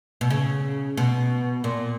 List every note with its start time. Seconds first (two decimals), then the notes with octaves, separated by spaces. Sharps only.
0.21 B2
0.30 C#3
0.97 B2
1.64 A#2